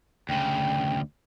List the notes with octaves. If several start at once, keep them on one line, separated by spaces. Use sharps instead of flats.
D2 C#3 G5